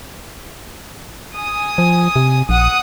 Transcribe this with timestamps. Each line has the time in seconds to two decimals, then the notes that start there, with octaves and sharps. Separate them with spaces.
1.35 G#5 D#6
1.78 F3
2.16 C3
2.49 A#1 F#5 D#6